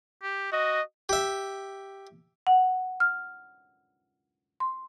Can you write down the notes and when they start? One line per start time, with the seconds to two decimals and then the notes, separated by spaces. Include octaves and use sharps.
0.23 G4
0.52 F#4 D#5
1.09 G4 E5
2.47 F#5
3.00 F6
4.60 C6